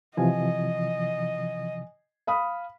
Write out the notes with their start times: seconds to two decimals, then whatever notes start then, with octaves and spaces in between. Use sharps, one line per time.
0.17 C3 E3 F3 D#5 G#5
2.27 F5 B5 D#6